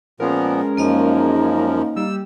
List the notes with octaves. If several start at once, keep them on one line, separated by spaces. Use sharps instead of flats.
A#2 F3 G#3 B3 C#4 A#4
F#2 F3 A#3 D#4 D#5 F5
G3 E6